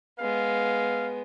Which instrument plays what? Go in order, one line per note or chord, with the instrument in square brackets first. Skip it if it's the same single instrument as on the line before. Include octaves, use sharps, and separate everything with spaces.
[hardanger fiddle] G#3 B3 [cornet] F5